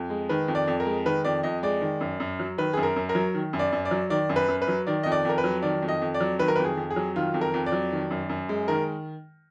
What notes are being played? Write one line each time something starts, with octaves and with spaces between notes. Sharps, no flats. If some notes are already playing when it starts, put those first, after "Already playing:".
Already playing: F2
G#3
D#3 B4
F2
D5
F2
A#4
G#3
D#3 B4
F2 D5
F2 D#5
G#3 D5
D#3
F#2
F#2
F#3
D#3 B4
F#2 G#4
A#4
F#2
A#4
F#3
D#3
F#2
D5
F#2
D5
F#3
D#3 D5
F#2
B4
F#2
B4
F#3
D#3 D5
F2 D#5
D5
F2 A#4
B4
F#3
D#3 D5
F2
D#5
F2
D5
F#3
D#3 B4
A#4
B4
F2
G#4
F2
G#4
F#3
D#3 F4
F2
A#4
F2
D5
F#3
D#3
F#2
F#2
G#3
D#3 A#4